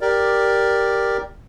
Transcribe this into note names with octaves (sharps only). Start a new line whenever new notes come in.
G4 A#4 D5